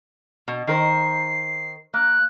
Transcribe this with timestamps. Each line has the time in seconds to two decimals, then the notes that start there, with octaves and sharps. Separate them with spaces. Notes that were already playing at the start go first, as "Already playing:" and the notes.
0.48 B2
0.67 D#3 A#4 C5 C7
1.94 A#3 F#6